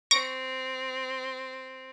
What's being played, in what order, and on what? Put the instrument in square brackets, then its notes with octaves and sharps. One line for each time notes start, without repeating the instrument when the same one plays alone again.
[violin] C4 [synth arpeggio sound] C#6 A#6 D7